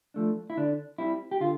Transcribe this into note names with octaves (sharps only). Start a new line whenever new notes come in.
F3 A3 D4
E4
D3 D4
G3 C4 E4
G4
D3 F4